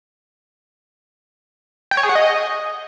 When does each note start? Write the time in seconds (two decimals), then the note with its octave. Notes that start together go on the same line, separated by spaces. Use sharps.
1.91 G5
1.97 C#5
2.03 G#4
2.09 F#5
2.15 D#5